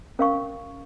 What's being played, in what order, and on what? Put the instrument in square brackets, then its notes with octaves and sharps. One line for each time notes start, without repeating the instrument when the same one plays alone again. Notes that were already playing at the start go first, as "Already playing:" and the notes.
[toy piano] C#4 A#4 F5 C#6